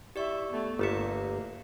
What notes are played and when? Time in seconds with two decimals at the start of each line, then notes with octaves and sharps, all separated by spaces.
0.16 E4 G4 D5 E5 C#6
0.49 A3 B3
0.79 G1 A3 A#3 G4 E5 C#7